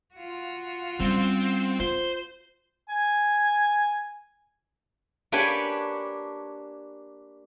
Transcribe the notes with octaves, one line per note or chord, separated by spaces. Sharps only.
F4 F#4
G3 C4 C#4
F4 C5
G#5
A#3 D4 G4 B4 C#5 G#5